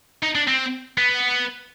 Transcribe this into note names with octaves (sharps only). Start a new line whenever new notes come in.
D#4
D4
C4
B3